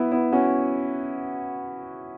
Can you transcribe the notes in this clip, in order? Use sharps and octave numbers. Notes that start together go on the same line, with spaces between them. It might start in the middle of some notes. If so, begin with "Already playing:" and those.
Already playing: B3 E4
B3 E4
C#4 F#4